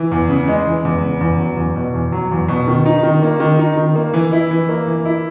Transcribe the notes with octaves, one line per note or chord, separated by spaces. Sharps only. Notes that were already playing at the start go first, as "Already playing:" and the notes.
Already playing: E3
E2
C#3
G#3
E3
E2
C#3
E2
F#3
E2
B2
E2
F#3
E2
B2
D#3
D#4
D#3
A#3
D#3
D#4
D#3
A#3
E3
E4
E3
A#3
E3
E4